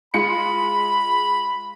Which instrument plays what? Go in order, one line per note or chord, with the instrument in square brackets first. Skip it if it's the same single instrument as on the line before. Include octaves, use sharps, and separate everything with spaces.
[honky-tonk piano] G#3 F4 C#7 [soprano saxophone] B5